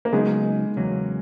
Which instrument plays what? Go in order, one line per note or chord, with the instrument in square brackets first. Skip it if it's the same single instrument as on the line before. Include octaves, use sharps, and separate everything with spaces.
[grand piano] A#3
[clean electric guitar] C#3 F#3 B3 D#4 [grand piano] G#3
[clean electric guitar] E2 C#3 F#3 A#3 C#4